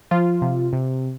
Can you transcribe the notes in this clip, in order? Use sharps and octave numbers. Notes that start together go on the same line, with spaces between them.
F3 F4
C3
C3